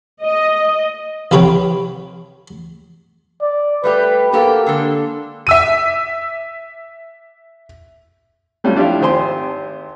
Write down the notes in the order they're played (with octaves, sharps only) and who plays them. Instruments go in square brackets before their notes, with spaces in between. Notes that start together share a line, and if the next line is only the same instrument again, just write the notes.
[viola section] D#5
[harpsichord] C2 F3 G4 B4 C#5 G5
[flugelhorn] D5
[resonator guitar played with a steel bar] G3 A3 G4 [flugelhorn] B4
[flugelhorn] A#3 [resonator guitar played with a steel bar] F#4 G4 A4
[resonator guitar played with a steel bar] D3 G#3 A4
[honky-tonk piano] E5 E6 D#7
[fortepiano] F#3 G3 A3 C#4 F4 G4
F3 D4 E4 F4 G4 F5
G#1 C4 G4 C5 G#5 C6